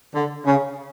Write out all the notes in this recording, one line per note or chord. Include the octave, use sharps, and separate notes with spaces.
D3
C#3